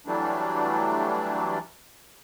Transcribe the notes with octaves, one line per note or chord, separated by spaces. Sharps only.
E3 F#3 G3 A3 D4